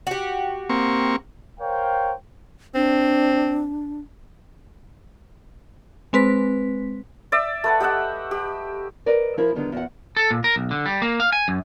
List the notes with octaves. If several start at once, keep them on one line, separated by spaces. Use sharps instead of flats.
F#4 G4
A#3 C4 C#6
A#4 C5 C#5 F5 G5
C4 D4
G#3 C4 B4 B6
D5 E5
A3 B4 F#5
G4 D#5 E5 F#5
G4
A#4 B4 D5 D#5
F3 E4 A#4
D3 D#3 G3 B3
E2 F#5
A4
A#2
A#4
B1
D3
G3
A#3
F5
G#5
F#2